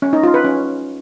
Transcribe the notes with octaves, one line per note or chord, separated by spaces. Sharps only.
C#4
D#4
F4
B4
C#4